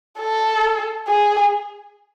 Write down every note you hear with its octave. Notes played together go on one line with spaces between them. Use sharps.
A4
G#4